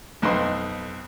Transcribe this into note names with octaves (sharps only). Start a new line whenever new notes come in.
B1 F2 D#4 B4 C6